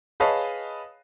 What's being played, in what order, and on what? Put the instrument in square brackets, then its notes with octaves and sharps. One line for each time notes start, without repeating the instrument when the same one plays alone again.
[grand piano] G#4 B4 C#5 D#5 F5 A5